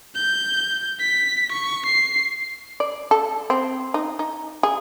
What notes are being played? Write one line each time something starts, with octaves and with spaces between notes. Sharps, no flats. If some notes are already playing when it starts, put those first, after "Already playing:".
G6
B6
C#6
C7
D5
A4
C4
D#4
D#4
G#4